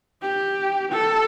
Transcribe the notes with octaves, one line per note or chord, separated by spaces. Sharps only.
G4
A4